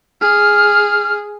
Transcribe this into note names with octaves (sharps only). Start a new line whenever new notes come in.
G#4 F6